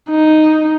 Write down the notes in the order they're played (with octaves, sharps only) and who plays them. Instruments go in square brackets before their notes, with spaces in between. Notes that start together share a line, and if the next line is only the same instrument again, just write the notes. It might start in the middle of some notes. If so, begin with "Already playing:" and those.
[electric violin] D#4